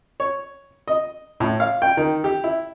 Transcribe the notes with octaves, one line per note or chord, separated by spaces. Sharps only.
C#5
D#5
A2
F5
G5
D#3
G4
E4